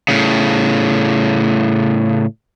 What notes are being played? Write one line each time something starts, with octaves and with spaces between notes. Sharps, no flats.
A2 C#3